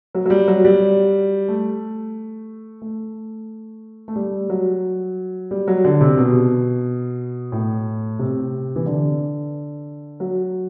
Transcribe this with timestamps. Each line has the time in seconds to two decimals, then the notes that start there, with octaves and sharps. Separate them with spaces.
0.15 F#3
0.26 F#3
0.30 G3
0.48 F#3
0.65 G3
1.48 A3
2.82 A3
4.08 A3
4.16 G3
4.50 F#3
5.51 G3
5.68 F#3
5.84 D3
6.01 C3
6.17 B2
7.52 A2
8.19 C3
8.76 E3
8.86 D3
10.20 F#3